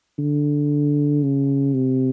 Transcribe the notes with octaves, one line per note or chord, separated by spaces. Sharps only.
D3
C#3
C3